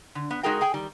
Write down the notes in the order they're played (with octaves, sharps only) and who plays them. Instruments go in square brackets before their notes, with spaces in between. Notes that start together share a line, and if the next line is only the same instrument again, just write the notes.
[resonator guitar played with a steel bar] D3
B3
G#3 D#4 F#4 G#4 A#4 G5
G#4 G5 G#5
D#3 G3